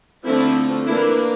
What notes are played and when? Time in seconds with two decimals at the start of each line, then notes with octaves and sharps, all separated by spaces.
0.25 D3 F3 A3 C4 E4
0.86 E3 A#3 D4 E4